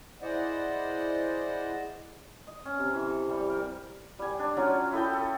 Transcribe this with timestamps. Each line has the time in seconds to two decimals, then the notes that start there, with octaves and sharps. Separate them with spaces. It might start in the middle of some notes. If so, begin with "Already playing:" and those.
0.22 E4 G#4 C5 D5 D#5 F#5
2.47 D#5
2.65 C#4
2.79 C3
2.93 E3
3.08 A4
3.29 G3
3.50 A#4
4.19 G3 G#5
4.39 D4
4.57 F#3 C#4 F4
4.92 E4 A4 D#5 G5
5.13 A4